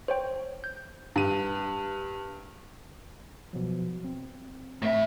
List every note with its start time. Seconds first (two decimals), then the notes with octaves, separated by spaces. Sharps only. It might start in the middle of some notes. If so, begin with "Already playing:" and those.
0.08 C5 C#5 G5
0.64 G6
1.16 G2 D#7
3.53 B2 F3 F#3
4.04 C4
4.82 A2 E5